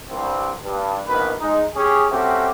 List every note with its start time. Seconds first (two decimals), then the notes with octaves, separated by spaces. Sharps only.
0.10 C2 G2 C4
0.64 G2
1.08 A#1 B2 D#3 B4
1.40 G#3 D#4
1.75 C#4 G4 G#4
2.10 A3 C4 C#4 F#4 G4